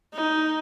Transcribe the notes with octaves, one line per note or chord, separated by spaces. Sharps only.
D#4